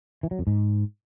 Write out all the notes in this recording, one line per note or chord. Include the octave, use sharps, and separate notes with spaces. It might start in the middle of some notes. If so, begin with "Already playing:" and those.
E3
F#3
F2
G#2